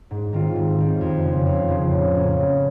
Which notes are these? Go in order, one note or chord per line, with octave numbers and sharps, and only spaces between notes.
G#2
D#3 G3 C4 F4
G#2
D#3 G3 C4 F4
F2
C#3 F3
F2
C#3 F3
A2
F#3 A#3 C#4
A2